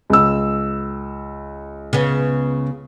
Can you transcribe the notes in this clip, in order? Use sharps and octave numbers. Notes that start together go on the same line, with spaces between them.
C#2 E6
C#3 B3